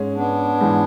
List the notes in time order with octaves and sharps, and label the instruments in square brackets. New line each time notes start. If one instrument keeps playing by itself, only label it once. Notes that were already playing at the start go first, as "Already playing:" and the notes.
Already playing: [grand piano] G#2 G#3 C#4 G#4
[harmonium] B3 D4
[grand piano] G#2 E3 G#3